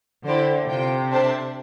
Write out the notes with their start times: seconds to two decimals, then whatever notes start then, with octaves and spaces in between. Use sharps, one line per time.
0.25 D3 E4 G4 C5
0.68 C3 F4 C5 G5
1.11 D4 A4 C5 E5 A5